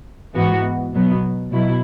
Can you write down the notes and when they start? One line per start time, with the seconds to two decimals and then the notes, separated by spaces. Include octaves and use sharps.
0.35 G#2 E3 B3 F#4
0.94 B2 F#3 B3
1.52 B2 F#3 E4